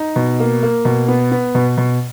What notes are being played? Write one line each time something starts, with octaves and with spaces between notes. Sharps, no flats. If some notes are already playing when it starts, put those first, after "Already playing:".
Already playing: D#4
B2
A#3
A#3
B2
B3
B3
B2
B2